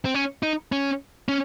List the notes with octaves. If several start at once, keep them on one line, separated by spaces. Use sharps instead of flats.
C4
C#4
D#4
C#4
C#4